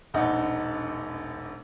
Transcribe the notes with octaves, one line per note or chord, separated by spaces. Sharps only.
E1 A#1 D#4 F#5